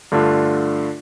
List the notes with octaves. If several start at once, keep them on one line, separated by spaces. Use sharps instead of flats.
G2 D3 A3 D4 F4